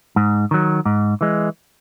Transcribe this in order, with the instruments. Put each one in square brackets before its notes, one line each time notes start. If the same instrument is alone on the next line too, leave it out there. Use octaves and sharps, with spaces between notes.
[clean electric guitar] G#2
D#3 F#3
G#2
E3 G#3